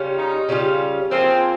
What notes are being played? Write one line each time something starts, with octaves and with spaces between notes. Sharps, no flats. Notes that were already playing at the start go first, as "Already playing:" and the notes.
Already playing: C#3 G3 C#4 F4
D#4
C#3 G3 C#4 F4
F3 A#3 C4 F4 G#4